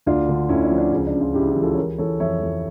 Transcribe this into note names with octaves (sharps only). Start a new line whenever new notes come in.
D2 D4 F4
D3
D2 C#4 E4
D4
F3
D4
C#2 C#4
D4
C#3
D4 F4
C#2 E4 G4
E4 G4
E3
F4 A4
C#5
E3 G4 A#4
E3 A4 C#5
F2 C#5 E5
F2